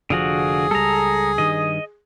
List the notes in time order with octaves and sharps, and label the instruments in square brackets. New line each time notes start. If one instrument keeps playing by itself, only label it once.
[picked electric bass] F1 F3 [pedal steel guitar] D3 F4 F#4 [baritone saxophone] G#4
[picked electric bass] C#2 G3 [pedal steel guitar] A4 A#5
[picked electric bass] G2 D#3 [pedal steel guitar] D#5